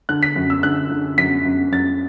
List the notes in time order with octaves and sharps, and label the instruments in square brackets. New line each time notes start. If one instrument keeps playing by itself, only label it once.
[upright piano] D3 F#6
B6
F#2
E6
D3 F#6
D3
F#2 B6
F#2
F#2 A6